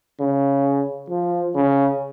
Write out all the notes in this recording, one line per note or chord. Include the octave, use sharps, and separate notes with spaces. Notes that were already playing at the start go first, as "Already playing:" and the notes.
C#3
F3
C#3